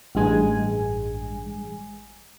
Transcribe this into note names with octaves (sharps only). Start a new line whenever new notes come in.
A1 G2 G#3 G#5